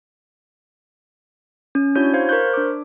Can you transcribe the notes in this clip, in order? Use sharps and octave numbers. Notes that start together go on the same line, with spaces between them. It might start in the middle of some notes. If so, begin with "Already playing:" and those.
C#4
D4 E4 F#4 C#5 G6
C5 F5 G#6
A#4 C5 C#6 F#6 G6
D4 D6